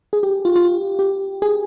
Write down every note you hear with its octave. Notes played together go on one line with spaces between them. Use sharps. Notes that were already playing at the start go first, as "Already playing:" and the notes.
G#4
G4
F4
F4
G4
G#4